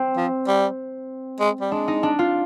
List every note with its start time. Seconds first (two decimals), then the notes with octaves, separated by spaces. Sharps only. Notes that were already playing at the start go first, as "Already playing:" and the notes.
Already playing: C4
0.17 F3
0.48 G3
1.40 G#3
1.61 G3
1.72 G#3 D4
1.88 D#4
2.03 D4
2.19 F4